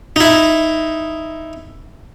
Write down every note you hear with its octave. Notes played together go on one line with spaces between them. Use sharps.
D#4 E4